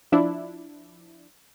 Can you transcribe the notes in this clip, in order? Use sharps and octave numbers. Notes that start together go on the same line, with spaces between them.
F3 D4 E4